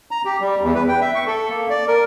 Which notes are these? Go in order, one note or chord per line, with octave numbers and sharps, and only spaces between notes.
A#5
G4
G3
E2
B4
G5
E5
C#6
A4
A#3
D5
A#4